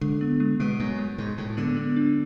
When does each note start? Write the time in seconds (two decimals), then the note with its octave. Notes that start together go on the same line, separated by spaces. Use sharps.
0.01 D3 G#3
0.21 B3
0.40 G#3
0.60 B2 G#3
0.80 F#2 G#3
0.98 G#3
1.18 G#2 G#3
1.38 A2 G#3
1.57 D3 B3
1.77 B3
1.96 D4